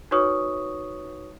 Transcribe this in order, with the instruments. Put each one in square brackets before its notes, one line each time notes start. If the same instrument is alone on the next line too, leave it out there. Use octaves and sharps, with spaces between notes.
[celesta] D#4 F#4 B4 C#5 C#6 D#6